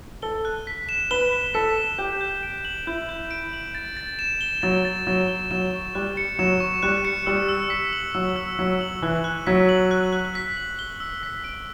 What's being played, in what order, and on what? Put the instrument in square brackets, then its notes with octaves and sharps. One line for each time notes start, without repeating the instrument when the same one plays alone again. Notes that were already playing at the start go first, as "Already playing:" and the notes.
[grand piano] A4 [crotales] G7
[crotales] F#6
B6
E7
[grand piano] B4 [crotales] G7
[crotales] F#6
[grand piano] A4 [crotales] B6
[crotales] E7
[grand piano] G4 [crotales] G6
[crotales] G6
D7
F#7
[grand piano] E4 [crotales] G6
[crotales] G6
D7
F#7
A6
A6
E7
G7
[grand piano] F#3 [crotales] A6
[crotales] A6
[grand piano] F#3 [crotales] E7
[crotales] G7
[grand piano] F#3 [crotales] E7
[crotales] C#6
[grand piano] G3 [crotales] F#6
[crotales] C#7
[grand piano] F#3 [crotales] E7
[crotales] C#6
[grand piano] G3 [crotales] F#6
[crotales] C#7
[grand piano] G3 [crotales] E6
[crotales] E6
B6
F#7
[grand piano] F#3 [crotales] E6
[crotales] E6
[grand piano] F#3 [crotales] B6
[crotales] F#7
[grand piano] E3 [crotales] F#6
[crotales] F#6
[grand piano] F#3 [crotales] B6
[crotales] F#7
F#6
F#6
B6
F#7
G7
E6
B6
D7